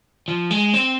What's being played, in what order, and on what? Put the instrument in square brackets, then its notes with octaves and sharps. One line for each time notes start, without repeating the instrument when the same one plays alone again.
[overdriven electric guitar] F3
G#3
C4